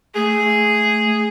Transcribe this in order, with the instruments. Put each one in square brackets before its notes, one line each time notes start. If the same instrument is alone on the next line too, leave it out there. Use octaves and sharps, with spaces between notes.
[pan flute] A3 [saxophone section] G#4